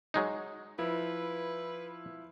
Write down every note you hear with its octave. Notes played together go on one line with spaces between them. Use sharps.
F#3 G#3 D#4
F3 E4 B4